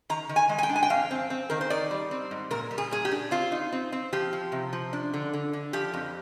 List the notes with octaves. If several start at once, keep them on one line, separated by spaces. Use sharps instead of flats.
D#3 A#5
D#3
G#5
G#3
G#5
G5
D4
G#5
G5
F2 F5
C4
C4
D#3 A#4
C5
D#4 D5
G3
C4
G#2
A#2 A#4
G3
G#4
A#2 G#4
G4
D4
C4 F4
D#4
C4
C4
F3 G4
F3
C3
F3
D4
D3
D3
D3
F3 G4
F2